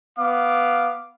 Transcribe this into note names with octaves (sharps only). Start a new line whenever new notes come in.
B3 F5 D6